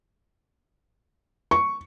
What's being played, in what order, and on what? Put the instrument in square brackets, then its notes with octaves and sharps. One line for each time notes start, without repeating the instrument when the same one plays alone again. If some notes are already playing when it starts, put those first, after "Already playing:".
[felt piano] C#6